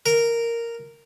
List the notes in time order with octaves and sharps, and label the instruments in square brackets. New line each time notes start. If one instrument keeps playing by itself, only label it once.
[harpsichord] A#4